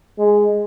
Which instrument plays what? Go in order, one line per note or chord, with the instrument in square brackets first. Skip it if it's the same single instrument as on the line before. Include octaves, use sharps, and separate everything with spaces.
[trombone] G#3